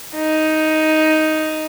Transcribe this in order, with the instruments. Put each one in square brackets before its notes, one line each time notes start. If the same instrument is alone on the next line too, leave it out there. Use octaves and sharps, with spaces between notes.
[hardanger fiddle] D#4